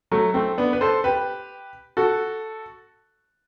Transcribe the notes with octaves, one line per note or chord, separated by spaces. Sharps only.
F#3 A3
A3 C4
B3 D4
B4
A4 C5
G4 B4
F#4 A4